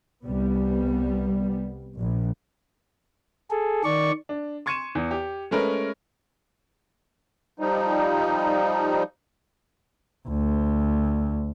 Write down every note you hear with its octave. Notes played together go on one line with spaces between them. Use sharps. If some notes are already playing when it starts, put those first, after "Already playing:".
C2 G3 B3
A#1
G#4 A4
D#3 D5 C#6
D4
C6 C#6 G#6 C#7 D#7 E7
E2
G4
G#3 A3 C#4 A#4 B4
F3 G3 D#4
D2